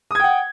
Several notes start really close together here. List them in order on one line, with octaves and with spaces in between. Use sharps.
D#6 G#6 G5 F#5